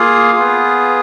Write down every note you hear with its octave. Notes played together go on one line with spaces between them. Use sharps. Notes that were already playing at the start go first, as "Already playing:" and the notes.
Already playing: A#3 F4 G#4 F5
B3 F4 G#4